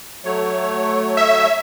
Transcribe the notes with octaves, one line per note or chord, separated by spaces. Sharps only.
F#3 A3 C#5
E5